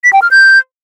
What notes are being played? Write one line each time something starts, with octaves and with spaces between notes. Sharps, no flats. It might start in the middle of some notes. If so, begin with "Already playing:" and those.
B6
G5
F6
G6